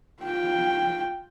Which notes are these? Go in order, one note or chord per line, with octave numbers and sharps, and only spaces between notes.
F4 G5